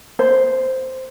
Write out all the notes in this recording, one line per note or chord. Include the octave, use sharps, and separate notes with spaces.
C5